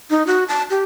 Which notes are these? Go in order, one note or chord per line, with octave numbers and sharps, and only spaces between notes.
D#4
F#4
A5
G4